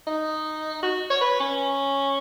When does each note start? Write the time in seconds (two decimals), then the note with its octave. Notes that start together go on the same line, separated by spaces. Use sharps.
0.07 D#4
0.83 F#4
1.10 C#5
1.21 B4
1.40 C#4